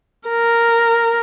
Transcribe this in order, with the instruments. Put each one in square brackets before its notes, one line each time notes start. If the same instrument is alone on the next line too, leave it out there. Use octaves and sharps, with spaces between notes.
[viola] A#4